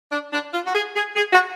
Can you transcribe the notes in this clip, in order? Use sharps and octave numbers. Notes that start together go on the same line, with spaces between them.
D4
D4
F4
F#4
G#4
G#4
G#4
F#4